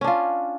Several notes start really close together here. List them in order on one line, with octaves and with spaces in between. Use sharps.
C#4 D4 F4